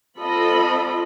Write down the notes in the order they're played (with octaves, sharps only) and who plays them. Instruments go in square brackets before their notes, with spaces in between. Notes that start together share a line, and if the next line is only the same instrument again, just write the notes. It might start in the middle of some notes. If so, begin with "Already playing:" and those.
[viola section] C4 F4 A4 D#5 B5